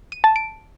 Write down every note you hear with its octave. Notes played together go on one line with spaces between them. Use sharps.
D#7
A5
D7